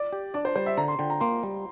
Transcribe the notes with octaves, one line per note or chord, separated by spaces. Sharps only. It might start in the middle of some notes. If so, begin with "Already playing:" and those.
Already playing: D5
G4
D4 D5
C5
G3 C5
E5
D3 A#5
C6
D3 G5
A#5
A#3 C6
G3